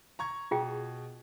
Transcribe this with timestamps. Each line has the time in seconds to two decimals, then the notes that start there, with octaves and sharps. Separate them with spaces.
0.19 A#5 C#6 G#6
0.51 B2 F4 G#4 G5